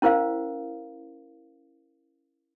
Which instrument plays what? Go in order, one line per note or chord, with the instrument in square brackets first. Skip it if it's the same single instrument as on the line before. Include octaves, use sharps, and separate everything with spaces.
[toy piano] C#4 E4 A#4 C5 F5